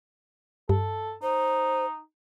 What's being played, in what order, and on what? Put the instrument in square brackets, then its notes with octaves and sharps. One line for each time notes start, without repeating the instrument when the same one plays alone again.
[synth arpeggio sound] G2 [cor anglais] A4
[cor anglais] D#4 [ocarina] C5